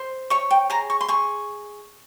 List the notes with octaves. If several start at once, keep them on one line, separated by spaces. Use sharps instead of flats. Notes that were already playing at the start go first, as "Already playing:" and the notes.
Already playing: C5
C#5 C#6
G5
G#4 A#5
C#6
C6
G#4 C#6